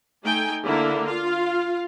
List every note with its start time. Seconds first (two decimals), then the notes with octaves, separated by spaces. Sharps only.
0.24 A3 D#4 G5 G#5
0.65 D3 A#3 E4
1.06 F4 F5